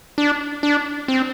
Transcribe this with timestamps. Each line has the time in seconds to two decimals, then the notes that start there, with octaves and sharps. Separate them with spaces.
0.18 D4
0.63 D4
1.08 C4